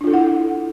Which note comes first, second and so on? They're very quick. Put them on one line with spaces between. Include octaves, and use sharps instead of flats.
D4 F4 A4 E4 F#5